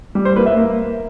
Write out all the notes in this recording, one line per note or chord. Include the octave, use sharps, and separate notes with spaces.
G3
C5
A#3 B4
E5
A#3